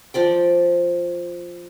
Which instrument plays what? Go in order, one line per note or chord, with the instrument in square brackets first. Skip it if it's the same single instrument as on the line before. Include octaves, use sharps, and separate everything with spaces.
[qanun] F3 D5 G5